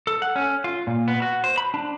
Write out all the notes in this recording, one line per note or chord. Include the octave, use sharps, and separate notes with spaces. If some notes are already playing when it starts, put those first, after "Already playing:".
A4
F#5
C#4
F4
A#2
B3
F#4
C5
B5
D4